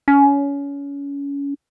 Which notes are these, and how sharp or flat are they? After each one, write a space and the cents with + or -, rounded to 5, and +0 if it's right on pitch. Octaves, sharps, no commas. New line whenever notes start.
C#4 +25